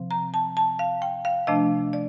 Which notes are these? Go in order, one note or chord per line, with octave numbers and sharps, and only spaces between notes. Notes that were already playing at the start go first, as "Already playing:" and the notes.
Already playing: C3 F3 C4
A#5
A5
A5
F5
G5
F5
C3 F3 A3 D4 D#5
D5